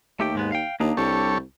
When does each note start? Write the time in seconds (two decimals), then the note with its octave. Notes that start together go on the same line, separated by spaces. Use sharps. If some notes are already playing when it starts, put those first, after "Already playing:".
0.20 D#2 A3 G4 G5
0.35 G#2 G#3 B3
0.52 F5 G5
0.80 D#2 A#3 D4 D#4
0.97 C2 G3 D4 A4 C#5